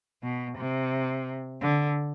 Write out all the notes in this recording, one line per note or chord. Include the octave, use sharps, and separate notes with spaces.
B2
C3
D3